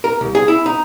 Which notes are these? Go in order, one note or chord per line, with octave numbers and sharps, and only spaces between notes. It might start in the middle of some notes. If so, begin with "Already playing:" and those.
A#4
C2
G#4
E4
D#4